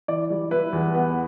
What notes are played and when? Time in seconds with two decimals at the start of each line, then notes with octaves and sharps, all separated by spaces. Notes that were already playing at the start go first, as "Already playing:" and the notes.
0.08 E3 D5
0.30 G3
0.51 E4 B4
0.73 E2
0.94 B3